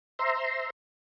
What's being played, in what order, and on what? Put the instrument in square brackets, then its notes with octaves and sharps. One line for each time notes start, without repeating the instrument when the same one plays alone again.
[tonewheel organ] C5 E5 A#5 C6